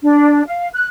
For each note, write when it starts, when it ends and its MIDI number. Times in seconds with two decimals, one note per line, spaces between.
0.03 0.42 62
0.46 0.68 77
0.73 0.87 90